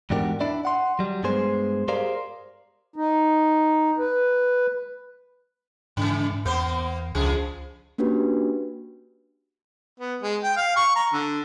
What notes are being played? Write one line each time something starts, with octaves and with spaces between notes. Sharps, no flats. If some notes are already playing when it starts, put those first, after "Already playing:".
E2 G#2 D4 F#4 G4 A#4
D4 E4 D5
F#5 C6
F#3 G3
G2 G#3 B3 G#4 C5
G4 G#4 A#4 C5 D5 F5
D#4
B4
G#2 C#3 E3
E2 A#3 B3 C5
C#2 C#3 F3 G#4
A#3 C#4 D4 F#4 G4 B4
B3
G#3
G5
F5
C#6
A#5
D3